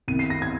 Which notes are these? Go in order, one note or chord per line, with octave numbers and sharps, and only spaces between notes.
C2 C3 D#3 D#7
C7
A#6
G#6